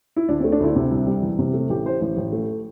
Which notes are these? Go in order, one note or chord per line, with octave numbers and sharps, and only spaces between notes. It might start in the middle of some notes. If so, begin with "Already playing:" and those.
E4
D2 D4
C4
A3
D4
D2 E4
C3
C2
G3
E2
C3
A3
A1 G4
A2 C5
A1
A1
A3